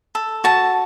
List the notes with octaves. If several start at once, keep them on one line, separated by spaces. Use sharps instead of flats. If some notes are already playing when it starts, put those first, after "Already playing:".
A4
F#4 A5